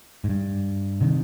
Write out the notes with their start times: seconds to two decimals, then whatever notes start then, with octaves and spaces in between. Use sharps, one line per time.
0.24 G#2
0.29 G2
1.01 C3 D#3